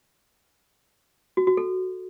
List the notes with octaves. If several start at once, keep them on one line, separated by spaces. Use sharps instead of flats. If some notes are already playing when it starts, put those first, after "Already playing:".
F#4
F#4
A4